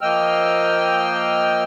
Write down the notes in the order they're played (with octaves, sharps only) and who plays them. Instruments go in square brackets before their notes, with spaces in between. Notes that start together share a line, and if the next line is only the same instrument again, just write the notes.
[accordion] F3 A#3 D#5 G5 E6 F6